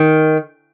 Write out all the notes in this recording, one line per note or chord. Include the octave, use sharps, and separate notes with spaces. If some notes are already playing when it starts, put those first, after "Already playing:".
Already playing: D#3